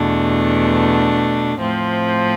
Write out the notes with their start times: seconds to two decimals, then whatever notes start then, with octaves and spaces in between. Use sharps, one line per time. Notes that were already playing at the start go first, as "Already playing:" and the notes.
Already playing: E2 B2 A3 D4
1.60 A2 F3 C4